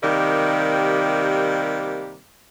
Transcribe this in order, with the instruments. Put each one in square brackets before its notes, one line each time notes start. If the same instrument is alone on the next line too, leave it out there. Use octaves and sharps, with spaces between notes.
[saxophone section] C3 D#3 G3 A#3 G4